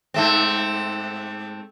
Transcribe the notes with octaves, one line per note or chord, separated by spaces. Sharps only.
G#2 A3 C4